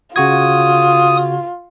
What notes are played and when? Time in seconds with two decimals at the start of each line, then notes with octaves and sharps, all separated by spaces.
0.16 C#3 F4 F#4 D#6 G#6